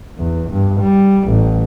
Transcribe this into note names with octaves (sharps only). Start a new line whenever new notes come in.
E2
G2
G3
A1